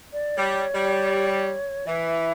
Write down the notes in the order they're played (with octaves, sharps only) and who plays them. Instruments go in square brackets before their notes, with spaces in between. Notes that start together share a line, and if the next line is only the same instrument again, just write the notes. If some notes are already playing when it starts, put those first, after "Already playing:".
[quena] D5
[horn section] G3 [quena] C#5
[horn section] G3
[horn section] E3 [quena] E5